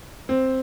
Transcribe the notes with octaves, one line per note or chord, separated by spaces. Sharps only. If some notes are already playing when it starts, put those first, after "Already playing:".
C4